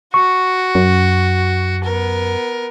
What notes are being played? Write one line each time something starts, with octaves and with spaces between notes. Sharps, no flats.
F#4 C#6
F#2
B3 A#4